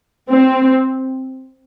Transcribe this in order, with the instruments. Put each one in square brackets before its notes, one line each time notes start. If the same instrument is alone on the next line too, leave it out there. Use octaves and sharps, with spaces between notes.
[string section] C4